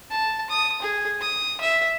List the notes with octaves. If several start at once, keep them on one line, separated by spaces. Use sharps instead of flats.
A5
D#6
G#4
D#6
E5